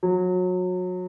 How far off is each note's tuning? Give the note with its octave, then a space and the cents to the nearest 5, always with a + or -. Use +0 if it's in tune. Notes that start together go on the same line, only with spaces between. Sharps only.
F#3 -25